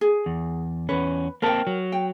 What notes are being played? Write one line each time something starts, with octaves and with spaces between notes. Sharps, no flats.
G#4
E2
E2 C#4 B4
A#3 C4 A#4 G5 A5
F#3
G5